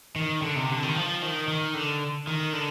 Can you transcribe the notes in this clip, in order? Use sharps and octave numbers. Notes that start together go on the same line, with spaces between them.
D#3
D3
C3
D3
D#3
F3
D#3
D#3
D3
D#3
D3